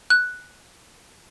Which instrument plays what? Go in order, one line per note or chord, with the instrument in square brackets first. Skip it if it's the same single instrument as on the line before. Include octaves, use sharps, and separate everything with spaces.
[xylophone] F#6